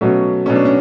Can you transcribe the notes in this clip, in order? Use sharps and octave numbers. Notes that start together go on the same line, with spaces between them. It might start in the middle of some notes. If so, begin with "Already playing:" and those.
B2 F#3 A3 C#4
B2 F#3 A3 C#4
D4
C#4